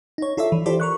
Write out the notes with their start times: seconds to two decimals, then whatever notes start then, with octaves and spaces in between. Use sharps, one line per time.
0.18 D#4 C#5
0.37 E4 F4 A4 C#5 D5 E5
0.52 E3
0.66 E4 F4 G4 A4 C5 D5
0.80 A#4 C#6 F#6